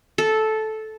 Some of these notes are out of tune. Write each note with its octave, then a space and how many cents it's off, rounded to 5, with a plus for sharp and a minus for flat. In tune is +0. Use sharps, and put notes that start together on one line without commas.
A4 -10